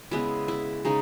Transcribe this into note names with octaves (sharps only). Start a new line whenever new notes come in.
C#3 G#3 B3 E4
E4
C#3 G#3 D#4